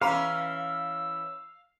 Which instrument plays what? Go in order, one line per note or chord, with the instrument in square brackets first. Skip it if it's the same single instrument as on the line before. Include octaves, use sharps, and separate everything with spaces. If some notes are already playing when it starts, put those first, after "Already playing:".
[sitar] E3 C#4 B4 [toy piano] G#4 A#5 B5 [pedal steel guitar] F5 [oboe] E6